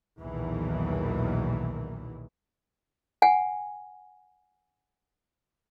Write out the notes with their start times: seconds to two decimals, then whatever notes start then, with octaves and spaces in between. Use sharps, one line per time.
0.20 B1 E2 A#2 D#3 E3 F#3
3.22 F#5 G#5